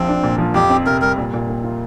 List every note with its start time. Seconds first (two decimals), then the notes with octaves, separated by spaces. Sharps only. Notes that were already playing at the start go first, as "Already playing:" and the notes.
Already playing: A#1 F3 C4
0.08 D4
0.23 A#2
0.38 F3
0.54 F2 G4
0.70 C4
0.86 C3 A#4
1.01 G3 A#4
1.17 A#2
1.34 A#2
1.49 A#3
1.64 F4